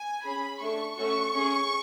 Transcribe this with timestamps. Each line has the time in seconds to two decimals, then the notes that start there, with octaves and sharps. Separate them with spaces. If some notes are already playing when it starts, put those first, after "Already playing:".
Already playing: G#5
0.24 C#4 G#4 B5
0.61 A3 D4 A4 C#6
0.97 A3 C#4 F#4 A4 C#6
1.34 C#4 G#4